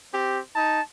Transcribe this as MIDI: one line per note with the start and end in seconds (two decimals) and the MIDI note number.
0.13 0.40 60
0.13 0.40 67
0.56 0.80 63
0.56 0.80 81